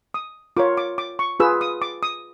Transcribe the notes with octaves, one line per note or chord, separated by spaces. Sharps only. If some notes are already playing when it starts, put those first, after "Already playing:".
D#6
F4 A#4 C#5 D6
D6
D6
C#6
F4 G#4 B4 E6
D#6
D6
D#6